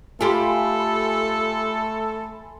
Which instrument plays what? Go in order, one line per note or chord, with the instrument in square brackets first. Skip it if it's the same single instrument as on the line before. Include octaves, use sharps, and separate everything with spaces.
[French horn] A3 [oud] F4 G4 [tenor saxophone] A4 [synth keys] G#5 B5 C6